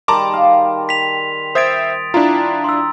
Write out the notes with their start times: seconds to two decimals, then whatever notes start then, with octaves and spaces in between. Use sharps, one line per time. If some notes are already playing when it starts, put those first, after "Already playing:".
0.08 D#3 G3 G#4 A5 A#5 C6 D6
0.34 F5
0.89 B6 F7
1.55 C5 E5 D#6 G#6 A6 D7
2.14 D4 E4 F4 A#5
2.64 C6 E6